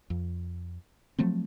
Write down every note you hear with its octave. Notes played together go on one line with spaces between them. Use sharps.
F2
F3 F#3 A3 C4